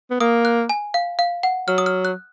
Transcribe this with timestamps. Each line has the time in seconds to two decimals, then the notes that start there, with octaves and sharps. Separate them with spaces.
0.11 B3
0.20 A#3 D#6
0.45 F#6
0.69 G#5
0.94 F5
1.19 F5
1.43 F#5
1.68 F#3 F6
1.78 D#6
1.86 F6
2.05 F#6